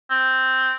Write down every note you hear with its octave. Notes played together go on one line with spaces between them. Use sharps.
C4